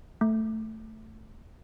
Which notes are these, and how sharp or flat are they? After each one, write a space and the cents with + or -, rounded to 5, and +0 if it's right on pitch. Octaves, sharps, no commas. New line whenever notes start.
A3 +5